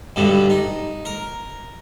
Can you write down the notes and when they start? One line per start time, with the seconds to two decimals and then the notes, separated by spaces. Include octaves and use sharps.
0.16 G2 B2 D3
0.50 D#4
1.05 A#4